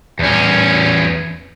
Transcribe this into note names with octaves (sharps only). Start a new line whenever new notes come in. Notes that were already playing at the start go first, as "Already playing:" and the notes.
E2 C#4